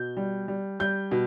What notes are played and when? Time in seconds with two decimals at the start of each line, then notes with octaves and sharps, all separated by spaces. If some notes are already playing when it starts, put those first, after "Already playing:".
Already playing: B2 G6
0.17 G3
0.48 G3
0.80 G3 G6
1.11 B2